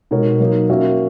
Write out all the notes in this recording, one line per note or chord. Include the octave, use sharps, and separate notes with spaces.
B2 G#3 D#4 A#4 C#5
F#3 A#3 D#4
A#3 C#4 F#4 C#5 E5